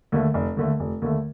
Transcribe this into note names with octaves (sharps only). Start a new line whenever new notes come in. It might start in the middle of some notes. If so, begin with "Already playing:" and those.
D#2 D3 A3
F1
D#2 D3 A3
F1
D#2 D3 A3